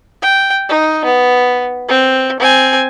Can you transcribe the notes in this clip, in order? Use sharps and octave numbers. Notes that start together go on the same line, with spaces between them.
G5
D#4
B3
C4
C4 G#5